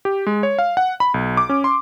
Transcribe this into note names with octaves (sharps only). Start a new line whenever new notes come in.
G4
G#3
C#5
F5
F#5
B5
B1
D6
C#4
C6